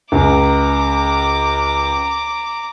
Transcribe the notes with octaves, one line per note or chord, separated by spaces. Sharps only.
C#2 A#5 D6